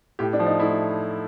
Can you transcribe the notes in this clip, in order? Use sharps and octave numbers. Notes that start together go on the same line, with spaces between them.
A2 G4
D4
F3
D#4
A3 E4